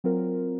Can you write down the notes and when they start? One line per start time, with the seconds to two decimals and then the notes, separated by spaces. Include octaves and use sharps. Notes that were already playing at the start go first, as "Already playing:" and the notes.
0.04 F#3 C4 F4 A#4